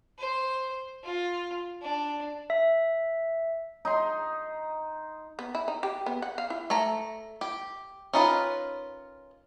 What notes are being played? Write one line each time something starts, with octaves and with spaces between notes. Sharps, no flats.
C5
F4
D4
E5
D#4 C6
B3
E4
D#4
G4
B3
F#5
F5
E4
A3 A#5
G4
C#4 D#4 F4 A#4 B4